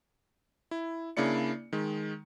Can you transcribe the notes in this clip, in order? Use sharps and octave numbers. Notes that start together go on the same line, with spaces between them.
E4
C#3 A#3 D4 E4 D5 C#7
D#3 G#3